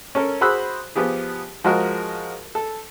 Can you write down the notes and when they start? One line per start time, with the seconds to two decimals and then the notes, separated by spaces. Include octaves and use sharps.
0.15 C#4 A4 A#4
0.41 F#4 G#4 C5 B5 E6 F#6
0.96 F3 B3 G4 G#4
1.64 F3 G#3 F#4 G#4 A#4
2.55 A4